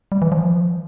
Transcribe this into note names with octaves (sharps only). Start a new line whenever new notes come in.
G3
E3
F3